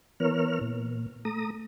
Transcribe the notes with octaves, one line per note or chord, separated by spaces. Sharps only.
E3 B3 A#4 C#5 F6
A#2
A3 A#5 D#6